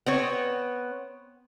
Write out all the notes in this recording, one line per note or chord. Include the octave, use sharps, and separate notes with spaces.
B3 C4 C#5